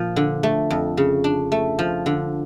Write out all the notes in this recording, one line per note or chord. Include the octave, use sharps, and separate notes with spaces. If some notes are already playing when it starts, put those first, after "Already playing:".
Already playing: A#2 F3
D3
A3
F2
C#3
D4
A3
F3
D3